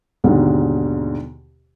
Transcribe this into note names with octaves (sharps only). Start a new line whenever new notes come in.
D#2 G#2 B2 D3